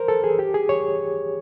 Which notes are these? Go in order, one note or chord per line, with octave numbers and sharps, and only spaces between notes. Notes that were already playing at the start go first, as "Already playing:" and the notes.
Already playing: A#4 C5
A4
G#4
G4
G#4
C#5